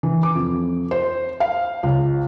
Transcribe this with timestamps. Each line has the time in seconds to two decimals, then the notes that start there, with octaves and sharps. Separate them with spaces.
0.03 E3
0.23 D6
0.35 F2
0.91 C5
1.40 F5
1.83 C#2